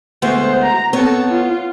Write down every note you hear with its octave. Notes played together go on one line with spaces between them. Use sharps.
D2 G#3 B3 C5
A#5
B3 C4 A4 C#5
F4